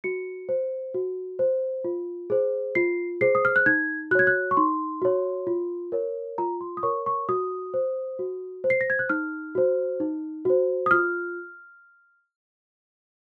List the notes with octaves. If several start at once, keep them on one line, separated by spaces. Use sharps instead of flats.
F#4 C#7
C5
F#4
C5
F4
G#4 C5
F4 C7
G#4 C5 C7
D#6
F6
F#6
D#4 G#6
F#4 C#5 F#6 G#6
F#6
C#6
D#4 C6
F#4 C#5
F4
A#4 C#5
F4 A#5
C6
D#6
A#4 C#5 C#6
C#6
F#4 D#6
C5
F#4
C5
C7
A#6
G#6
F#6
D#4 F6
F#4 C5
D#4
F#4 C5
D#6
F4 F6